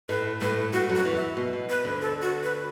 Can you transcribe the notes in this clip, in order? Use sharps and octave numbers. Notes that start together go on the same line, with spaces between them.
A2 A3 B4
A2 A3 B4
A2 A3 F#4
F#2 F#3
F#4
E2 E3
E5
B2
B2
B4
D2 D3
A4
F#4
B4